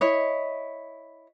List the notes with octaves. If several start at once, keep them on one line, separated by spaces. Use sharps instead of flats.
E4 C#5 D#5